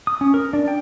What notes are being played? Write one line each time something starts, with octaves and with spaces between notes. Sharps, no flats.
D#6
C#4
A#4
D4
G5